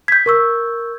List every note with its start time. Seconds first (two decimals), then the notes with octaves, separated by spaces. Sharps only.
0.08 G6 G#6 B6
0.26 A#4 C#6 E6